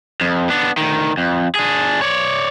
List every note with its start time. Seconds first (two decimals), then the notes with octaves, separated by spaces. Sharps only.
0.21 F2
0.50 B3 D4
0.77 D2 D#3
1.18 F2
1.55 D4 G#4
2.02 C#5 D5